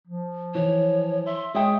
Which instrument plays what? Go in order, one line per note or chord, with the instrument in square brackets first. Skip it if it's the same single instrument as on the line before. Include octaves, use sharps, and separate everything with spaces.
[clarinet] F3
[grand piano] E3 [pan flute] C#5
[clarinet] E5 [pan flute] C6
[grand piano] G#3 E5 G5 [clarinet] C#5 [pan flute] D#6